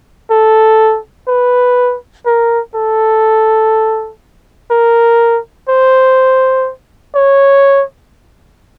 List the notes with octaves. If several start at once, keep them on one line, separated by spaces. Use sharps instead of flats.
A4
B4
A#4
A4
A#4
C5
C#5